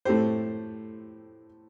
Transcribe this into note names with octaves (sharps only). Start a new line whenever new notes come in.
A2 A3 C4 G4 C5